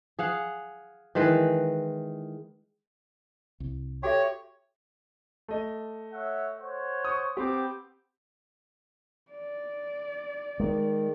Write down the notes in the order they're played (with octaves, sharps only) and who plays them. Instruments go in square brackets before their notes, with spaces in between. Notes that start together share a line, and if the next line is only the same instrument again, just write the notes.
[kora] G#4 F5 F#5
D#3 E3 G#3 B4
[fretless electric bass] C2
[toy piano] F#4 A4 E5 [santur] G4 [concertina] C#5
[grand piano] A3 D#5
[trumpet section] C#5 E5 F#5
C5 C#5 F#5
[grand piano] C#6 D#6
[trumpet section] B3 G5 D6 [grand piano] C4 G4
[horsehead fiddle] D5
[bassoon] D#3 [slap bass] G#3